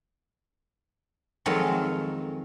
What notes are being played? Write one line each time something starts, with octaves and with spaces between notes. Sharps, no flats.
F2 D#3 F#3 G#3 A4 F5